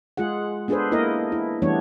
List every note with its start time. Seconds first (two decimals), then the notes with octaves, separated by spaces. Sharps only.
0.17 G#3 F4 G#4 F#5
0.68 B3 D4 G#4 A4 B4 C5
0.92 A#3 E4 A#4 C5 D#5
1.32 E4
1.62 E3 G3 A3 B3 D4 C#5